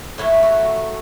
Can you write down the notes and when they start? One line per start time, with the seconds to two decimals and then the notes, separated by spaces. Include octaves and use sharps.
0.18 A2 F#3 A3 E4
0.43 F#4